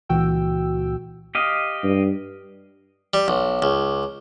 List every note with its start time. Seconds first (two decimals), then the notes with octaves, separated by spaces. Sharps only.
0.09 C#2 A#2 E3 F#4 G5 E6
1.35 G4 D#5 F5
1.83 G2
3.14 G3
3.28 B1
3.62 C#2